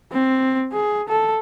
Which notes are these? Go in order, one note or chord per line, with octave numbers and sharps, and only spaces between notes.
C4
G#4
A4